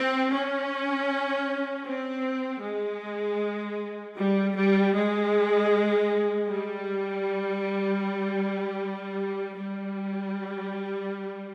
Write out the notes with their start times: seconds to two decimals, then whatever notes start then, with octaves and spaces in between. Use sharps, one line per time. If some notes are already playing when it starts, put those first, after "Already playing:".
Already playing: C4
0.32 C#4
1.86 C4
2.63 G#3
4.17 G3
4.55 G3
4.94 G#3
6.48 G3
9.57 G3